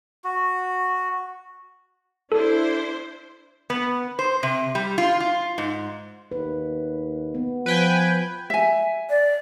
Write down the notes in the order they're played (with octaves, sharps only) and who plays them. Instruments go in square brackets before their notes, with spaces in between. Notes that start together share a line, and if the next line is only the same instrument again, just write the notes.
[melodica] F#4
[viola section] D4 E4 C5 [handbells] A4
[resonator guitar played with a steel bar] B3
C5
C3
G3
F4
F4
G#2
[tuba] D#2 [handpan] B4
[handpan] B3
[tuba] F3 [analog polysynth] B4 G5 G#5
[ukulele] E5 G#5
[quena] D5